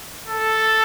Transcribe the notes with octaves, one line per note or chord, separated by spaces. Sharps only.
A4